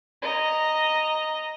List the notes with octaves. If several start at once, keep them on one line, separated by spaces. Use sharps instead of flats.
D#5 A#5